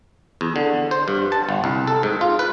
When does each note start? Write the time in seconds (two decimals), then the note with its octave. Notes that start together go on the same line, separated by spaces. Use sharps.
0.41 E2
0.56 D3
0.91 C5
1.08 G2
1.32 A5
1.49 G1
1.64 C2
1.87 A4
2.03 G#2
2.21 F4
2.39 B4